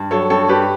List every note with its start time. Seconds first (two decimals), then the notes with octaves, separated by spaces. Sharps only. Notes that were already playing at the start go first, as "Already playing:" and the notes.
Already playing: G2
0.11 F#3 A4 C#5
0.30 G2 A4 C#5
0.49 G2 G4 B4